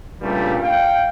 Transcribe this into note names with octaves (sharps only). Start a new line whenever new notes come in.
G2 A#2 C#3 G3 A3
F5 G5